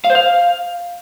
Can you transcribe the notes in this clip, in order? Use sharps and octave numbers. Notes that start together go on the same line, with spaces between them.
F5
C5
F5